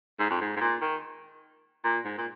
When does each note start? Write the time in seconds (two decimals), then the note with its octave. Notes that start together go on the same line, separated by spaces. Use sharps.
0.20 G#2
0.30 F2
0.41 G#2
0.56 G#2
0.61 A#2
0.81 D#3
1.84 A#2
2.05 G#2
2.18 A#2